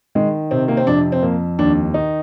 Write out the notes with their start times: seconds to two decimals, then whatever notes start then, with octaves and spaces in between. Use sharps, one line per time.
0.15 D#3 G#3
0.51 C3 C4
0.68 A#3
0.77 C4
0.87 F2 D4
1.12 C4
1.23 F2 A#3
1.59 D#2 D4
1.94 D#3 D#4